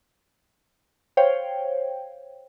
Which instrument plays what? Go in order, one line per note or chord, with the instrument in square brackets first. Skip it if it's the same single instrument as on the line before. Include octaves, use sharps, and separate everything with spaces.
[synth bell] C5 C#5 F5 G5